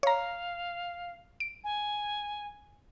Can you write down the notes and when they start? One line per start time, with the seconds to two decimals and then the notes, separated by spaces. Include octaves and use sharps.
0.03 C#5 F5 A#5
1.40 D7
1.64 G#5